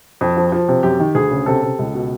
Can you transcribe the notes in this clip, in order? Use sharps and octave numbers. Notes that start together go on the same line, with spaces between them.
F2
F3
F3
C3
F#2 G4
D#3
D2 G#4
C#3
C3 A4
C3
C#2
B2